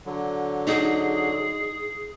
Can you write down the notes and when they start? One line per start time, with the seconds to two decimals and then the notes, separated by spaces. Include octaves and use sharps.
0.06 D3 F#3
0.67 D#4 G#4